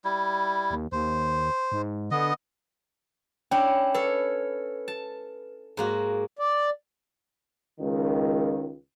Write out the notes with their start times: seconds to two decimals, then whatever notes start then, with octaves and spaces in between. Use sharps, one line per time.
0.05 G3 E4
0.71 D#2
0.92 D#2 C5
1.72 G#2
2.11 D3 B3 D#5
3.51 C#4 D4 E4 G5
3.94 A4 B4 C#5
4.88 A5
5.77 G#2 A#3 F#4
6.39 D5
7.80 C#2 D#3